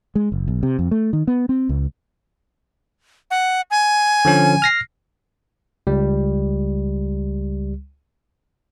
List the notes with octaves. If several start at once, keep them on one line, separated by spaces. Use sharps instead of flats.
G#3
F#1
B1
C3
F2
A3
D#3
B3
C4
C#2
F#5
G#5
D3 F3 C#4
F6 A#6 C7
C#2 G3